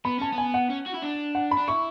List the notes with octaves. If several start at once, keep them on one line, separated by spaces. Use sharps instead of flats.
B3 B5
C#4 A5
B3
G#5
F#5
C#4
F#4
E4
D4
F#5
B5
D4
E4 C#6